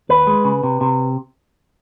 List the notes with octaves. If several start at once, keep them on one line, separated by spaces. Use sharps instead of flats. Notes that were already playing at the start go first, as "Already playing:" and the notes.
D#2 B4
G#3
C#3
C3
C3